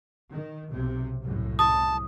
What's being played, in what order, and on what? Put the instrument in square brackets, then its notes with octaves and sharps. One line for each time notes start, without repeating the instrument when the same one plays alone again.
[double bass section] D#3
B1 C3
C2 F#2 A2
[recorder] A5 [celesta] D#6